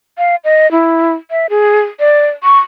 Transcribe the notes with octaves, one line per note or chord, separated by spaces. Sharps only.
F5
D#5
E4
E5
G#4
D5
C#6